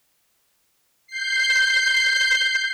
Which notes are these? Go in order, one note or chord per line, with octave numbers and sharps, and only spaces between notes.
G6 C7